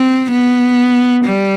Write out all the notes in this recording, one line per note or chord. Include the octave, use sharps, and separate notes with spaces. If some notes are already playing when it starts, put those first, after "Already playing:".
Already playing: C4
B3
G3